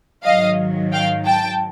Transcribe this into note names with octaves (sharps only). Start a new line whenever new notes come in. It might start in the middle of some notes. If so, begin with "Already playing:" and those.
G#2 D#3 F#3 D#5 F5
F5 G5
G5 A5